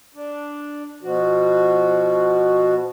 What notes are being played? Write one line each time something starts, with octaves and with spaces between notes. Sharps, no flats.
D4
B2 F3 F#4